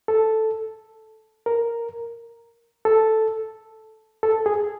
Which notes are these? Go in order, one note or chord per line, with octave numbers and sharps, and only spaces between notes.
A4
A#4
A4
A4
G#4